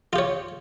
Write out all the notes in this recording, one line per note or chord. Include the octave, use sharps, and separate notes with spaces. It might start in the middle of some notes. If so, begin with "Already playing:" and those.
F4 G4 C#5